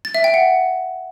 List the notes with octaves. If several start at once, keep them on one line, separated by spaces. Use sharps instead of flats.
A6
E5
G5
F#5